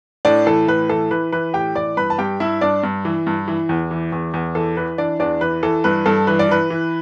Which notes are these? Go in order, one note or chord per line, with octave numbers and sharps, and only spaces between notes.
A2 D4 D5
E3 A4
A2 B4
E3 A4
E3 B4
E3 B4
A2 G4 G5
E3 D5 D6
G2 B4 B5
A5
G2 G4 G5
G2 E4 E5
G2 D4 D5
G2
E3
G2
E3
E2
E3
E2
E2
E3 A4
E3 B4
E3 D4 D5
E2 D4 D5
E3 B4
E3 A4
G2 B4
G2 A4
E3 B4
D5
E3 B4
E3